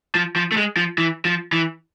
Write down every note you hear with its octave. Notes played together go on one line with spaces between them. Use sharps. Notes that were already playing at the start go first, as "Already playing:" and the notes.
F3
F3
A3
G#3
F3
E3
F3
E3